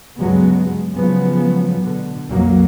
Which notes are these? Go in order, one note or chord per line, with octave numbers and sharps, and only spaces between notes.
D2 G2 C#3 F#3 G#3 B3
C#3 F3 F#3 G#3 B3
B2 D3
B1 F2 F#3 A#3